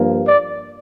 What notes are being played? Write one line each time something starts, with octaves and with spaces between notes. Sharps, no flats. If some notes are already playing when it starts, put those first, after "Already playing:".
Already playing: G2 F3 A#3
D5